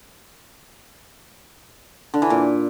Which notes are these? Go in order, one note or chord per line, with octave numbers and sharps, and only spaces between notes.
D3
E3
A#2